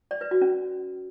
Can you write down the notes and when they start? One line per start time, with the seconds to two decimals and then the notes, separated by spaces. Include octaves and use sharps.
0.11 D5
0.21 B4
0.31 F#4
0.41 C#4